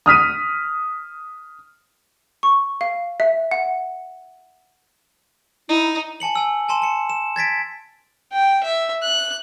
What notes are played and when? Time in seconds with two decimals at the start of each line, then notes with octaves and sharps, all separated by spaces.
0.06 D#6 F6 B6 D#7
2.43 C#6
2.81 F5
3.20 E5
3.51 F#5
5.69 D#4 E4
6.20 G#5 A5 C#7 F#7
6.36 G#5 E6
6.68 G#5 A5 C6 E7
6.82 A5 C#7
7.09 E7
7.36 G#6 A6 B6 D7
8.33 G5
8.63 E5
9.03 F#6